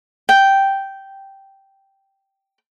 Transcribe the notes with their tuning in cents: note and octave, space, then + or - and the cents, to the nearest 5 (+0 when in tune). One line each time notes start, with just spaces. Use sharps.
G5 -5